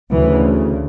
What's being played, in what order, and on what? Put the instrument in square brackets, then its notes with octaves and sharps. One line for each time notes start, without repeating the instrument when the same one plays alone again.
[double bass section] D2 C#3 E3